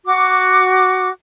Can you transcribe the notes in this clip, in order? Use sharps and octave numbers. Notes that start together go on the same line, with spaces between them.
F#4 D6